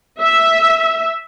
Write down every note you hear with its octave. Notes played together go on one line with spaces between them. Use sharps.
E5